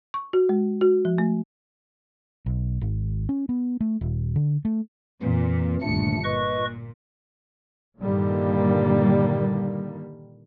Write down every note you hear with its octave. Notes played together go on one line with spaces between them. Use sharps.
C#6
F#4
G#3
F#4
F3
A3
B1
G#1
C#4
B3
A3
D#1
D3
A3
F2 A#2 E3
G1 D#2 A#2 A3 D4 C#7
A#2 B4 D#5 C#6
G2 A#2 D3 D#3 G3 A#3